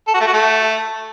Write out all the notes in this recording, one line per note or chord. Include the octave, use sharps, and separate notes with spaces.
A4
F#4
A3
F#4
A3